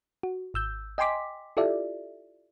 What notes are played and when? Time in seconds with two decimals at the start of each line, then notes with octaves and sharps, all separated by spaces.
0.23 F#4
0.54 G#1 E6 G6
0.98 D#5 G5 G#5 C6 D6 B6
1.57 E4 F4 G4 A4 D5 E5